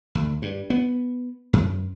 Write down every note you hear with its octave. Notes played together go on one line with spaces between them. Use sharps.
D2
G2
B3
F#2